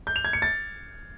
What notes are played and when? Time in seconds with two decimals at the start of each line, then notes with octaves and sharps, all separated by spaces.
0.07 G6
0.16 F7
0.25 G#6
0.33 C#7
0.42 A6